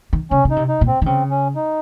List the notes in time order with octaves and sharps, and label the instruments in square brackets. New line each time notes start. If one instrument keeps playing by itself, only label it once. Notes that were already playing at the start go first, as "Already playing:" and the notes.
[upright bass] D#3
[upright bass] C#3 [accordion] C#4
[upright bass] C#3
[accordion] D#4
[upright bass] C3
[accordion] D#4
[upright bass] A#2
[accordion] C4
[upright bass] D#3
[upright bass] C#3 [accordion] C4
[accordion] C#4
D#4